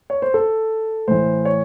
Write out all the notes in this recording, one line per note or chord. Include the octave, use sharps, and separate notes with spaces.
C#5
C5
A4
A2 E3 C5
C#5